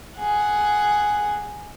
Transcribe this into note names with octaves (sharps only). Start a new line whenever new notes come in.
G#4 F#5